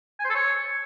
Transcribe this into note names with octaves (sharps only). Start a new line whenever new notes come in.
G#5
C5
A4
C#5